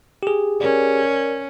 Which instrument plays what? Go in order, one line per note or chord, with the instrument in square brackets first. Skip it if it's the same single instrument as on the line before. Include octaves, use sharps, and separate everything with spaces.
[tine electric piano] G4 G#4
[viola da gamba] C#4 [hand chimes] A#4 D5